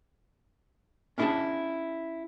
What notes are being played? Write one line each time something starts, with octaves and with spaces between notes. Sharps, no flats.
C#4 D4 E4 G4 G#4 A5